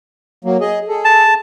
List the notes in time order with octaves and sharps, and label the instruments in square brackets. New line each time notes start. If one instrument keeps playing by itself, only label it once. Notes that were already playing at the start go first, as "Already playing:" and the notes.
[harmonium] F#3 A#3
G#4 D#5
G#4 A4
[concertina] A5